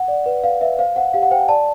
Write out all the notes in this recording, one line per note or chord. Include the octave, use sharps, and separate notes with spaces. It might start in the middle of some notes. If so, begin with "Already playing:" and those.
Already playing: F#5
D5
B4
B4 F5
B4 E5
C5 F5
C5 F#5
G4 F5
F#5
C5 G5
G#5
D5 A5